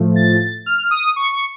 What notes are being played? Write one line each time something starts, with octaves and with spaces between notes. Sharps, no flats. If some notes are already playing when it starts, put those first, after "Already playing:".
Already playing: A2 F3 A3
A6
F6
D#6
C#6
C#6